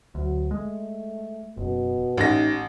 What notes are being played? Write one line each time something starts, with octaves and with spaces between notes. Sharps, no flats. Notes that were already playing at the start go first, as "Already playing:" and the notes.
D2 F#3
G#3 A3
F#1 B2
A1 A2 D#4 A#6